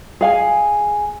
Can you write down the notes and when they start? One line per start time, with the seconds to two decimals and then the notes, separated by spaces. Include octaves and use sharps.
0.21 G#4 F5 G#5